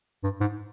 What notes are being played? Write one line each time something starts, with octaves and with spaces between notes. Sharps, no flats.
G2
G#2